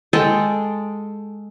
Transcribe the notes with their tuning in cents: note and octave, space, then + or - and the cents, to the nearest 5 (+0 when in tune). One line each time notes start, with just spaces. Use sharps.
G#3 +0 A4 +0 G5 +0